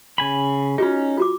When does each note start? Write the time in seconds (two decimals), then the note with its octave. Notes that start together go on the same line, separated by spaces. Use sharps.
0.18 C#3 G#5 B5
0.78 C#4 D#4 F4 F#4 G#4
1.18 F4 F#4 D6